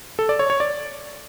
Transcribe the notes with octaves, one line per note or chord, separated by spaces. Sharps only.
A4
D5
C#5
C#5
D5